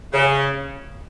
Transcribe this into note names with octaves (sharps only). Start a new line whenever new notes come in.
C#3